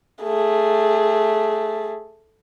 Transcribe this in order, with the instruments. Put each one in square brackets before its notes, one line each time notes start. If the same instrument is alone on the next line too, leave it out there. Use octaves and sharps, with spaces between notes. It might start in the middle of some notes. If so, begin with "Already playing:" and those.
[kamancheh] A3 G#4